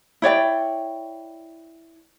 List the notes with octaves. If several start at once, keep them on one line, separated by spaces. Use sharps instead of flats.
E4 C#5 D5 G5